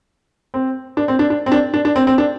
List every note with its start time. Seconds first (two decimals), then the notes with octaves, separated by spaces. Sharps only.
0.54 C4
0.97 D4
1.08 C4
1.19 D4
1.30 D4
1.46 C4
1.52 D4
1.74 D4
1.85 D4
1.96 C4
2.07 C4
2.18 D4